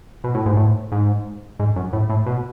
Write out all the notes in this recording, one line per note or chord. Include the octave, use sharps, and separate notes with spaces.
B2
A2
G#2
A2
G#2
G#2
F#2
A2
A2
B2